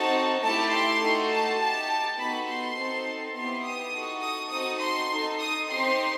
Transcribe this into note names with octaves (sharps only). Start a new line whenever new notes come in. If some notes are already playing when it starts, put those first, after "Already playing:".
Already playing: C4 D#4 F#4 A4 A5
A3 E4 G4 A5
C6
A3 D#4 F#4 A4
A5
D#4 G4 A5
B3 D#4 F#4 A4 B5
C6
C4 D#4 A4
B3 E4 G4 C6
D#6
D#4 F#4 A4
D#6
C4 D#4 F#4 A4 D#6
C6
D#4 A4
D#6
C4 D#4 G4 C6